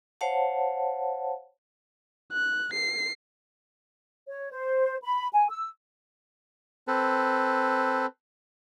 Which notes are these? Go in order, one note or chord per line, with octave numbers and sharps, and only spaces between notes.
C5 C#5 F5 F#5 A5
F#6
C7
C#5
C5
B5
G#5
E6
C4 A4 B4